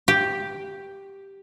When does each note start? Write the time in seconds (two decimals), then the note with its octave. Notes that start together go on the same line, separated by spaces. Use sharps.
0.08 G4